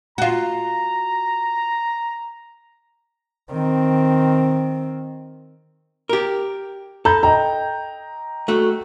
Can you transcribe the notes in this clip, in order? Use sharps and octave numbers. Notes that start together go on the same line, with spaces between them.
F4 F#4 A#5
D#3 C4
G4 A#4
A4 A#5 B5 G6
D#5 G5 A#5
A3 F#4